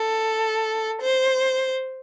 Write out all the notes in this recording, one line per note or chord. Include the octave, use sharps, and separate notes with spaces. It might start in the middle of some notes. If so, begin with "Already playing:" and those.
Already playing: A4
C5